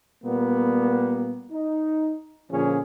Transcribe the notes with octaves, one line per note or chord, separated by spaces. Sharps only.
A#2 G3 A#3 B3
D#4
A#2 D3 F3 C#4 G#4